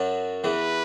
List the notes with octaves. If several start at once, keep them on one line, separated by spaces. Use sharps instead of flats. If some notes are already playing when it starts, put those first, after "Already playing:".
Already playing: F#2 F#3
E2 E3 B4